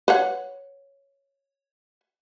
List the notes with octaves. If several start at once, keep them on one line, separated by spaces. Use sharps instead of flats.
B4 C#5 F#5